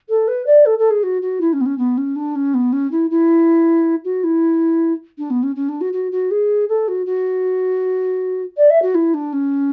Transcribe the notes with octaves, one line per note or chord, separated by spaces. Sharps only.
A4
B4
D5
A4
A4
G#4
F#4
F#4
E4
C#4
B3
C#4
B3
C#4
D4
C#4
B3
C#4
E4
E4
F#4
E4
D4
B3
C#4
C#4
D4
F#4
F#4
F#4
G#4
A4
F#4
F#4
D5
E5
F#4
E4
D4
C#4